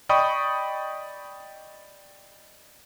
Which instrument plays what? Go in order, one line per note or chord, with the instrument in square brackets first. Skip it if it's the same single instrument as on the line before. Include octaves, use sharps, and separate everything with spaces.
[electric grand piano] D5 D#5 G5 B5 C#6 D#6